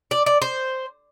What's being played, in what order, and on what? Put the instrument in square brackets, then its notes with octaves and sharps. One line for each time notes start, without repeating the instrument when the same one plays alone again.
[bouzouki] D5
D5
C5